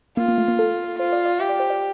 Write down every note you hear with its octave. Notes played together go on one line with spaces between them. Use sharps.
A#3 F4
A#3
A3
A#3
A4
F4 C5
D5
D5
G4 E5
D5
C5
D5